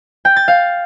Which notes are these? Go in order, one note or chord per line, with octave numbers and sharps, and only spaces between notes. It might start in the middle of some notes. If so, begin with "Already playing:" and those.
G5
A6
F5